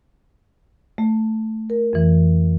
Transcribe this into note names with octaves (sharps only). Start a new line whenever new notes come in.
A3
A#4
F2 E3